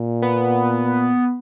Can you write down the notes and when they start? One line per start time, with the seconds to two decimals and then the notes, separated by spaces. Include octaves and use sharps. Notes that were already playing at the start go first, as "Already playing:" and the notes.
Already playing: A#2
0.22 B3